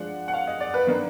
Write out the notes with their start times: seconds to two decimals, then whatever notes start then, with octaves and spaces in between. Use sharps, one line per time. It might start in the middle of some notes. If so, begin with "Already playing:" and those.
Already playing: F3 G#3 D4 F#5
0.28 F#5
0.34 F5
0.47 D#5
0.61 D5
0.74 B4
0.87 D#3 A#3 D4